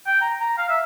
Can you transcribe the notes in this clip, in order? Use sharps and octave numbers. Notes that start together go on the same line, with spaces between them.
G5
A#5
A#5
F5
E5